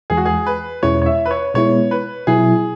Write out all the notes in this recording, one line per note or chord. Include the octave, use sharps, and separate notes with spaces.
E2 E3 G#3 G#4
F#4
G#4
B4
E2 B2 G#3 C#4 E4 C#5
C#5
E5
B4
C#5
B2 G#3 B3 E4 C#5
B4
B2 F#3 E4 G#4